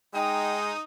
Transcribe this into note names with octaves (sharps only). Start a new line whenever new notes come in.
G#3 D#4 G5 D#6